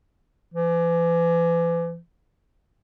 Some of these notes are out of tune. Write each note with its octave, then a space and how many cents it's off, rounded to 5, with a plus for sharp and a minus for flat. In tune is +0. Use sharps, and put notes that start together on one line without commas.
E3 +40